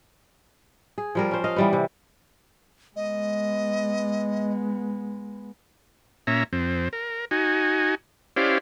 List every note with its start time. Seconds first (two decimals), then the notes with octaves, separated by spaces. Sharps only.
0.98 G#4
1.15 F3 G3 A#4
1.31 C#4 C5
1.44 D#5 F5
1.56 E3 G3 B3
1.73 C3
2.96 G#3 B3 D#5
6.27 A#2 C#4 E5 A#5
6.53 F2 C4
6.93 A#4
7.31 D#4 F#4 G#5
8.36 C#4 E4 G4 C5 D5 F5